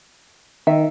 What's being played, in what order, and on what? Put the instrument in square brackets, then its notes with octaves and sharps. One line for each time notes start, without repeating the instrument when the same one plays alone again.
[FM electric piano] D#3 [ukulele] E5